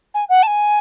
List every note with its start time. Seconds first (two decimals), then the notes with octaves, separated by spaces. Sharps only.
0.14 G#5
0.29 F#5
0.42 A5
0.47 G#5